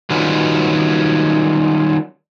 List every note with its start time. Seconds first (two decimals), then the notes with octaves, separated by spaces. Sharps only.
0.10 D#3 F#3 G3 C#4 F4 B4